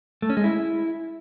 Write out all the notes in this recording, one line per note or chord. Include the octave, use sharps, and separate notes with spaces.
A3
C#4
G#3
E4